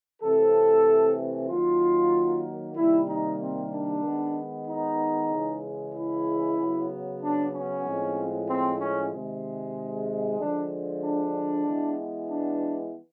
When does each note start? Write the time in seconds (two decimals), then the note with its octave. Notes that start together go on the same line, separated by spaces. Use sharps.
0.21 C3 E3 A3 C4 A4
1.48 D#3 F#3 A#3 F4
2.76 C3 D#3 G3 A#3 E4
3.08 D#4
3.39 C4
3.71 D4
4.03 D#3 G#3 B3
4.67 D#4
5.30 C#3 E3 G#3
5.94 E4
6.58 C#3 F#3 B3
7.21 D4
7.53 C#4
7.85 A2 F3 G#3 C4
8.49 C4
8.80 C#4
9.12 C3 D#3 G#3
10.39 D3 F3 G#3 D4
11.02 D4
11.66 E3 G#3 B3
12.30 D4